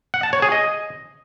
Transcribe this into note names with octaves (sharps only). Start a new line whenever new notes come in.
F#5
A5
C#5
G#4
D#5